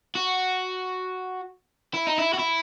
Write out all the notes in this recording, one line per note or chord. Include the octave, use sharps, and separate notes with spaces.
F#4
E4
D#4
E4
F#4
E4